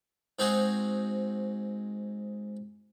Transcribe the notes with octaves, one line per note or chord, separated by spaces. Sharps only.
G#2 C4 D#4 F#4 G#4